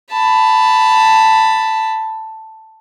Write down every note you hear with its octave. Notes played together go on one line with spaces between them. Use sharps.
A5 B5